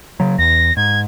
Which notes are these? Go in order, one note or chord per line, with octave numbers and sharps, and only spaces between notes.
C#3 F#3
E2 A#6
G#2 G#6